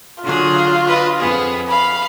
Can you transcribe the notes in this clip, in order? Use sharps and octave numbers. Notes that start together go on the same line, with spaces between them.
D3 F#3 F4 G#4
D4 B4 D#5
F2 B3 G#4
F5 B5